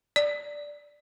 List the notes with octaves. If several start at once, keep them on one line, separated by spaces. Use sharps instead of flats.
D5